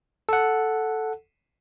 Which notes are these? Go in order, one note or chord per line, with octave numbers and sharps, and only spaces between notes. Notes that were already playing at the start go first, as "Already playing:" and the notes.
A4 F#5